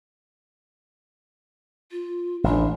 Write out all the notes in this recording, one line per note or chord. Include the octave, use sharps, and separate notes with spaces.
F4
A1 D4